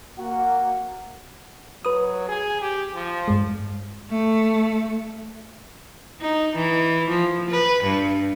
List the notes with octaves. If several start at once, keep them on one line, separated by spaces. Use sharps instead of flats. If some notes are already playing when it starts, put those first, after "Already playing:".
A#3 F#4 F#5
F#3 B4 D#6
G#4
G4
F3
G2 G#3
A3
D#4
E3
F3
B4
G2